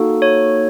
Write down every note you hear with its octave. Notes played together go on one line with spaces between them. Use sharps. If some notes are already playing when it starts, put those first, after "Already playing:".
Already playing: A#3 D#4 F#4 A4
C#5